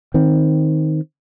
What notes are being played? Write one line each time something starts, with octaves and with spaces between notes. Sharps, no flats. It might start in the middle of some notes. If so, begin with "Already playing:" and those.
D#3 C4